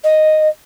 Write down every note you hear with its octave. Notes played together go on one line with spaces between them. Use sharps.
D#5